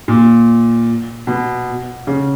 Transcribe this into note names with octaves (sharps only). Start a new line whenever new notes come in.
A#2
B2
C#3